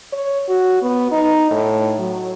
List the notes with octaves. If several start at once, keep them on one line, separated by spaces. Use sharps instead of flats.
C#5
F#4
B3
D#4
A2
F#3